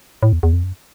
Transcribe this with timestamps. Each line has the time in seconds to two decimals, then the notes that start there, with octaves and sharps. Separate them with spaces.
0.23 A2
0.33 E2
0.43 E2
0.53 F2
0.63 F#2